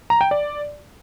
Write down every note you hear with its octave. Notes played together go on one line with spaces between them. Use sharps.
A#5
G5
D5